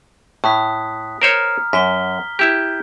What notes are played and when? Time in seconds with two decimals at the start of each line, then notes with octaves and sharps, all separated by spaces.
0.44 A2 D#6 F#6 B6
1.22 A#4 C5 C#5 A#5 F6
1.73 F#2 B6 G7
2.39 E4 G4 G6